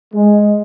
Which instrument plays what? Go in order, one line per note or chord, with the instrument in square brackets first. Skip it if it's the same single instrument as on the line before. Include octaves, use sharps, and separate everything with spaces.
[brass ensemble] G#3